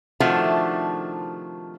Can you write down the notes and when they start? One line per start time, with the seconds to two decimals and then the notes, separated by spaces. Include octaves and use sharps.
0.20 C3 D#3 F3 A3 D4 F#4